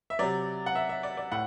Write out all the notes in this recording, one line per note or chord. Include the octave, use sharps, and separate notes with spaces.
E5
C3 F#3 D5
F#5
E5
E5
D5
D5
A2 F#5